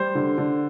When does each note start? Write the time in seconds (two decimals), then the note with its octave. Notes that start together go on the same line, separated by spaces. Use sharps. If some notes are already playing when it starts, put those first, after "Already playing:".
Already playing: G3 C5
0.15 D3
0.38 D3